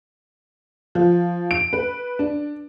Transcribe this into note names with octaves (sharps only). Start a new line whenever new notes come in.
F3
D7
B4
D4